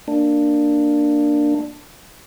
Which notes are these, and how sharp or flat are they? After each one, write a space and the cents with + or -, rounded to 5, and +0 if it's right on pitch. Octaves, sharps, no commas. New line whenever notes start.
A#3 -10 D4 +10